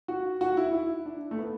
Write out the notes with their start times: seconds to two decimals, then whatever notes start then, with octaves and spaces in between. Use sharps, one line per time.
0.08 F#4
0.41 F#4
0.57 E4
0.73 E4
1.05 D4
1.31 A3
1.38 B3